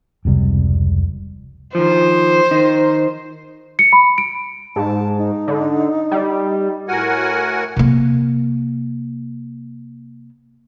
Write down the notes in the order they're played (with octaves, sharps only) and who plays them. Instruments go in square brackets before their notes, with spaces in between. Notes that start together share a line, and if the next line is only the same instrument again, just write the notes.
[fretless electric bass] F1 C#2 C3 G3
[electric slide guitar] D#3 F3 [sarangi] C5
[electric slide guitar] D#3 D#4
[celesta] C#7
B5
D7
[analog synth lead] G#2 [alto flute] A5
[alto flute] D#4
[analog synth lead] D3
G3
[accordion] A2 F#4 A#4 F#5 G#5
[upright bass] C3 A#3